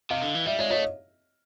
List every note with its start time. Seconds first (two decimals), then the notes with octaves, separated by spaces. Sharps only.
0.10 C3 D#5 F5
0.22 D3
0.35 E3
0.46 G3 D5 E5
0.58 G#3 C#5 D#5
0.70 A3 C#5 D#5